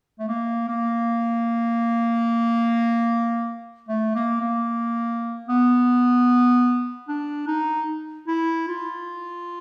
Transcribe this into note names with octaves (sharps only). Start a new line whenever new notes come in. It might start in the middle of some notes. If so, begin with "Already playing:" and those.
A3
A#3
A#3
A3
A#3
A#3
B3
D4
D#4
E4
F4